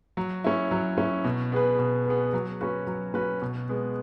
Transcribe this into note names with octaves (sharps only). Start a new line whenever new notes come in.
F#3
C#4 E4
F#3
C#4 E4
B2
B3 G#4 B4
B2
B3 G#4 B4
F#3
C#4 F#4 B4
F#3
C#4 F#4 B4
B2
G#3 B3